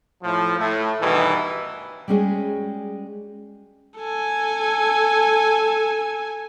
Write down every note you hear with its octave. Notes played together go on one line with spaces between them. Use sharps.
A2 F3
A2 A3
G2 B2 D#3 E3
G3 G#3 C#4 F#4 G#4
A4 G#5